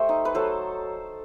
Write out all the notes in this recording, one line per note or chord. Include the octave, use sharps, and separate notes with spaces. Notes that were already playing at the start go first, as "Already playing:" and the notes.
Already playing: A3 G4 A4 C5 D#5
D#4
B4
F#3 A4 C5